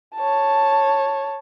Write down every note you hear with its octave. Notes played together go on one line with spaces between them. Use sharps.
C#5 A5